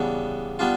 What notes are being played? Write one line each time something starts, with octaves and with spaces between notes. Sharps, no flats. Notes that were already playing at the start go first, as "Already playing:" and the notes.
Already playing: C#3 E3 G3 B3 D4
G3 B3 D4 F4